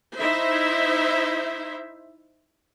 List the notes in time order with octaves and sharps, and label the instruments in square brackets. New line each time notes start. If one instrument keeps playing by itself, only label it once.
[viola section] D#4 E4 C5 E5